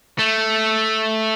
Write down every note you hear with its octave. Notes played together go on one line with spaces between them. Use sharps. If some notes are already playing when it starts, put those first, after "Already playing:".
A3